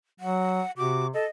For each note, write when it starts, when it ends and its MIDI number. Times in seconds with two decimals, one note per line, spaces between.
0.20 0.61 54
0.20 0.71 78
0.77 1.10 48
0.77 1.06 66
0.77 1.07 86
1.14 1.24 69
1.14 1.28 75